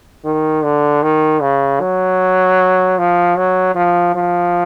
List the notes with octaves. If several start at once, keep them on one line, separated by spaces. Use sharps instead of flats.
D#3
D3
D#3
C#3
F#3
F3
F#3
F3
F3